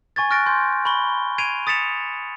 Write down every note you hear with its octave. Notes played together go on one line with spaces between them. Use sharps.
G#5 C#6 G#6 A6
C#6 F6 F#6 A6 A#6 D7
C6 G6
B5 C#6 G7
G#6 C7 D7 D#7 F7
D#6 A6 B6 C#7 E7 F7